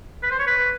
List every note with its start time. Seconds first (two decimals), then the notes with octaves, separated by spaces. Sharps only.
0.23 B4
0.31 C5
0.39 C#5
0.47 B4